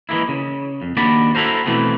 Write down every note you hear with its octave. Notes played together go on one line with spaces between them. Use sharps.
E3 G#3 A#3 E4
C#3
F2
D#2 A#3 D4 F#4 D5 B5
E4 F#4 A4 A#4 C5
B2 E3 A3 B3 C4